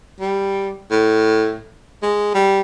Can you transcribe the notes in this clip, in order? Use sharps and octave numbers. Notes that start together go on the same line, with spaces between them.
G3
A2
G#3
G3